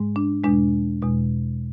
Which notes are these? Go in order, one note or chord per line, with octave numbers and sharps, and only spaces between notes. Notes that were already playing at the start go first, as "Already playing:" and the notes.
Already playing: G#2 G#3
D4
E2 B2 G#3 D4
E2 B2 G#3